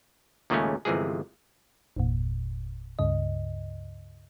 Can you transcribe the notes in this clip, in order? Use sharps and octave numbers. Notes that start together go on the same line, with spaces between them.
D#2 A#2 C#3 G#3 A3 C#4
G1 C3 E3 F3 G#3 G#4
G1 E2 A#2
C#2 G2 C#3 D#5